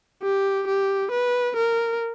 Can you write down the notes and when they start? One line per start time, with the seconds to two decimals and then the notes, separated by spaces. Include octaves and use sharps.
0.23 G4
0.67 G4
1.11 B4
1.56 A#4